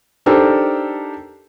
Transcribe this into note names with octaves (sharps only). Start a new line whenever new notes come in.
D4 D#4 G4 A4 A#4 C5